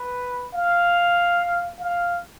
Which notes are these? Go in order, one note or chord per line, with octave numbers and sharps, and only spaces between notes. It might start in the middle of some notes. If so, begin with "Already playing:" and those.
Already playing: B4
F5
F5